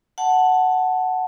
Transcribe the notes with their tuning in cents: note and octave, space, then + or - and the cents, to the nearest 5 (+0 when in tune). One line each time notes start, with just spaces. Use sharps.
F#5 +0 A5 +0